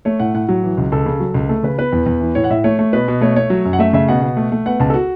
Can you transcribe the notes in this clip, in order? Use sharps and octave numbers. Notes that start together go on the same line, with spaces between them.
A3 C#5
A2 F#5
A2 F#5
F#3
E3
C#2
C#2 A4
C#3
F#3
C#2
A3 A4
C#3 B4
B3 B4
E2
E2
E3
A2 C#5
F#5
A2 E5
A3 C#5
A3
B2 B4
B2
A3 C#5
A3 C#5
F#3
F#2
F#5
A3 E5
C#3 E5
B2 F#5
B2
A3
A3
B3 F#5
C#2 A5
A4
F#4